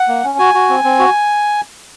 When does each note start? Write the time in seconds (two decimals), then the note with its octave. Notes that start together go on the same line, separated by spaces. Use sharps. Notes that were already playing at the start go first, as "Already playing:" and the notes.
Already playing: F#5
0.08 A#3
0.24 C#4
0.39 F#4 G#5
0.54 F#4
0.69 C4
0.84 C4
0.99 F#4